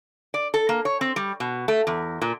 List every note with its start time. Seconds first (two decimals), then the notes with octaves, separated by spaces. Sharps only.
0.34 D5
0.54 A4
0.69 A#3
0.85 C#5
1.01 C4
1.16 G3
1.40 B2
1.68 A3
1.87 E2
2.22 A#2